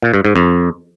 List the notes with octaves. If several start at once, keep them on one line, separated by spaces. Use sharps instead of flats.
A#2
G2
G#2
F2